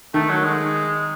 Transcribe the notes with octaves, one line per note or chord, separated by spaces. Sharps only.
D#3 A3
F#3
G#3